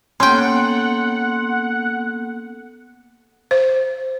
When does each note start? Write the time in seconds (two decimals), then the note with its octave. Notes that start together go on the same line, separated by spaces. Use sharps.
0.20 A#3 B3 C#4 A4 F#5 G5 C6
3.51 C5